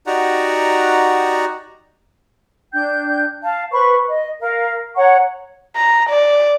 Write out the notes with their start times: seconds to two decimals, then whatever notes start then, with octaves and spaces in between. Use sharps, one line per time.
0.07 D#4 F#4 G4 D5 F#5 A#5
2.73 D4 G5 G6
3.43 F5 A5
3.72 B4 C5 B5 C#6
4.07 D#5
4.40 A#4 F5
4.95 C#5 F#5 A#5 C#6
5.76 A#5
6.09 D5